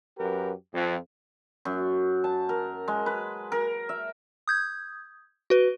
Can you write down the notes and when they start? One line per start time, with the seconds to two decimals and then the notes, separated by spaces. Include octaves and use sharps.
0.18 F#2 G4 A#4 B4
0.74 F2
1.65 F#2
2.24 A5
2.49 A#4
2.88 G#3
3.06 B4
3.52 A#4
3.89 E5
4.48 D#6 G6 G#6
5.50 F#4 B4